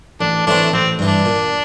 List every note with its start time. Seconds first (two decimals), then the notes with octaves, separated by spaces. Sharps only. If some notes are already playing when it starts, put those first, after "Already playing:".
0.21 A1 D4
0.47 A2 E3 A3 C4 D4
0.73 A1 C4
0.99 G2 E3
1.08 D4
1.25 A#2